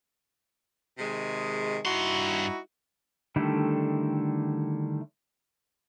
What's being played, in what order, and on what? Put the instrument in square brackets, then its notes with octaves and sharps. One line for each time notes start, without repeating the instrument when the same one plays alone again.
[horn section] C3 D#3 G#3
[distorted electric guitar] G2 C6 [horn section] D#4 E4 F#4
[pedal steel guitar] D3 D#3 G3 A3 E4